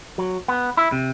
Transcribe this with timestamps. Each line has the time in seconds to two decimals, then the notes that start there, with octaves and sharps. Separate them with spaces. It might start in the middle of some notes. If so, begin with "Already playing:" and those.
0.18 F#3
0.48 B3
0.77 E4
0.92 C3